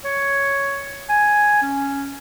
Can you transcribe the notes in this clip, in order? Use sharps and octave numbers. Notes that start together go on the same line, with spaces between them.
C#5
G#5
C#4